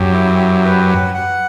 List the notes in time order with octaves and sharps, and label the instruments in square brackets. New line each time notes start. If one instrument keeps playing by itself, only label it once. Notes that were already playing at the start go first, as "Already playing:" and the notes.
Already playing: [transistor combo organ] F#2 [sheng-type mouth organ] G4
[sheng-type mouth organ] E4
G4
B4
F#5
F#5